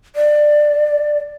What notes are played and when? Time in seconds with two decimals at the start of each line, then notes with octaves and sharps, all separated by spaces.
0.16 D5